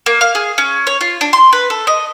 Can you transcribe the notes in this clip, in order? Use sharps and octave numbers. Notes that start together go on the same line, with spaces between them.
A#3
F5
G#4
C#4
C#5
F4
D4
C6
B4
A4
D#5